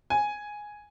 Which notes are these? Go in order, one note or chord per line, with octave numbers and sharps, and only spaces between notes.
G#5